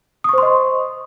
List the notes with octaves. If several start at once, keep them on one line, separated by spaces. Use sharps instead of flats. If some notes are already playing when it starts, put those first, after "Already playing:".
C5 D#5 C6 C#6 D#6